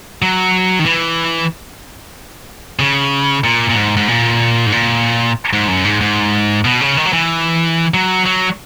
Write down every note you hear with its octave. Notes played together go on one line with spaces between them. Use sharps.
F#3
D#3
E3
C#3
A#2
A#2
G#2
G#2
A#2
G#2
A#2
G#2
F#2
G#2
G#2
B2
C#3
D#3
F#3
E3
F#3
F#3